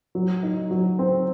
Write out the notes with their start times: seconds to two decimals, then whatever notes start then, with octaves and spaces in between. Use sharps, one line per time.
0.15 F#3
0.43 D#4
0.71 F#3
0.99 C4